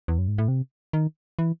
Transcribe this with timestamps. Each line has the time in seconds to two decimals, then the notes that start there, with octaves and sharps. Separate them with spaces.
0.08 E2
0.18 F#2
0.28 G#2
0.38 A2
0.48 C3
0.93 D#3
1.39 E3